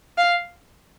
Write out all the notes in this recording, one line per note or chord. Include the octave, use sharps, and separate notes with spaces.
F5